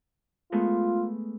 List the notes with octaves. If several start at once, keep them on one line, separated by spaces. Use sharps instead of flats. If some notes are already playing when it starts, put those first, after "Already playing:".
G#3 A3 B3 F4